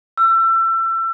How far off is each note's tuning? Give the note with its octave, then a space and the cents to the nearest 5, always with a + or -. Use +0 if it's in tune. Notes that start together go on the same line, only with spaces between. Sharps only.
E6 +30